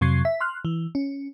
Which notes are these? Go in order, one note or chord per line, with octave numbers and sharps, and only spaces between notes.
F2 C3 F#3 C#6 G#6 C7
E5 B6
C6 F6 F#6
E3
C#4